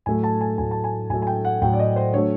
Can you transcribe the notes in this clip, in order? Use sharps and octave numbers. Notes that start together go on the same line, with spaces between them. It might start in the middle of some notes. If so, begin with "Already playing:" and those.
A2 F#3 A3 G#5
A5
G#5
A2 F#3 A3 G#5
A5
G#5
A2 F#3 A3 G#5
G#5
G5
F#5
A2 F#3 A3 G5
D5
D#5
C5
D3 F#3 A3 C#5